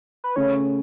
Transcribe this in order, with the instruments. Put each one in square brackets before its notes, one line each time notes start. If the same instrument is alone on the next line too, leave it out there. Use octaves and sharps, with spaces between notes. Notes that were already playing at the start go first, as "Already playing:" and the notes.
[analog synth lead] B4
[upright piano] C#3 A3 C#4 [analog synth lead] C#5